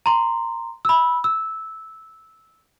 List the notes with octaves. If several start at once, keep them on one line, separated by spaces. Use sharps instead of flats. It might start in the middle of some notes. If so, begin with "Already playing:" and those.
A#5 C6
B5 E6
E6